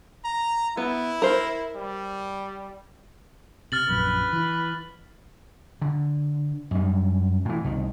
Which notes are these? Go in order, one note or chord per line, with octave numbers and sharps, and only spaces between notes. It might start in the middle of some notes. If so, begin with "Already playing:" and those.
A#5
B3 E4
A#4 C5
G3
C3 F6 A6 F#7
A#1 F#2 A#2 B4
E3
D3
F#2 G3
A2 E3
C2 D#3